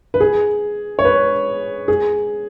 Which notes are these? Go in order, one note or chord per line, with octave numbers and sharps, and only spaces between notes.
B4
G#4
C#5
B4
G#4